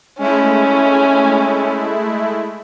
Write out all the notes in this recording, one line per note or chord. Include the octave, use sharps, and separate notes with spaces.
G#3 A3 C#4 E4